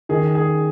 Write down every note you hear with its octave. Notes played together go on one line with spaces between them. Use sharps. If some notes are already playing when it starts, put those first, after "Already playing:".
D#3 G#4
G#4